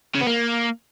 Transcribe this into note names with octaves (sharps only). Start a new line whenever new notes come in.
C#3
B3
A#3